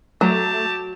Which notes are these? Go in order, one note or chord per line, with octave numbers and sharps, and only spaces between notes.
F#3 A3 G4 A5